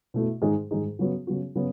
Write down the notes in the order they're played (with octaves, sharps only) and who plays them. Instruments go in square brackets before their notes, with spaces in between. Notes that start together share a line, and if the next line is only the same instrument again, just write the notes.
[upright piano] B2 A3 E4
G#2 D#3 G#3 D#4 G#4
G#2 D#3 G#3 D#4 G#4
C#3 F#3 B3 F#4
C#3 F#3 B3 F#4
C#3 F#3 B3